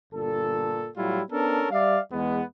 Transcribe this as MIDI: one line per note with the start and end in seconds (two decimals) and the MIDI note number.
0.13 0.89 31
0.13 0.89 46
0.13 0.89 69
0.96 1.21 45
0.96 1.21 54
0.96 1.21 55
0.96 1.21 64
0.96 1.21 65
1.31 1.67 59
1.31 1.67 61
1.31 1.67 62
1.31 1.67 69
1.31 1.67 70
1.71 1.99 55
1.71 1.99 74
1.71 1.99 76
1.71 1.99 77
2.12 2.42 40
2.12 2.42 56
2.12 2.42 59